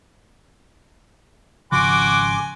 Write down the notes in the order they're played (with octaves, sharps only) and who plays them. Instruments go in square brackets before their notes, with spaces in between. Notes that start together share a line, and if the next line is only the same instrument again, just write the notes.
[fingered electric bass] G#1 C#3 F3 [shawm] F#4 [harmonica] G#5 C6 [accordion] D6